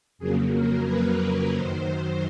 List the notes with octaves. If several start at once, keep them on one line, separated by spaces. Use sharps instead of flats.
F2 C#3 F#3 A#3 G#4
A#4
B4
F#2 D#3 F#3 C5